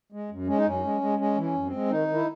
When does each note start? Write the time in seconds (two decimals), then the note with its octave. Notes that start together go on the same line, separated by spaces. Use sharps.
0.12 G#3
0.30 F#2
0.48 G#3 C#4
0.57 D#4
0.65 F#2 C#4
0.84 G#3
1.01 G#3
1.18 G#3 C#4
1.36 E3
1.42 C#4
1.54 F#2
1.67 C4
1.72 G#3
1.90 D#3 D#4
2.08 D#3
2.14 E4